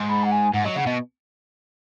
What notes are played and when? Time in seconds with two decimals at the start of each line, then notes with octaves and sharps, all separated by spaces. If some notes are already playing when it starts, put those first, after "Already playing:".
Already playing: G#2
0.09 B5
0.23 F#5
0.31 G#5
0.53 G#2 F#5
0.64 F#3 D#5
0.76 C#3 F#5
0.86 B2 D#5